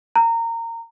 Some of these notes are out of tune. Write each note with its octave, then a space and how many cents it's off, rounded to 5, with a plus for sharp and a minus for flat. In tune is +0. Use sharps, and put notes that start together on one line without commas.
A#5 -20